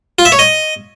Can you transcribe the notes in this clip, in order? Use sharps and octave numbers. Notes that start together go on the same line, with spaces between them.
F4
E5
C#5
D#5